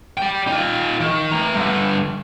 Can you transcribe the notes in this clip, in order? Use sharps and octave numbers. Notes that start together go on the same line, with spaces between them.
D5 G5
D#4 F4
D#3
A3 A#5
G2 D3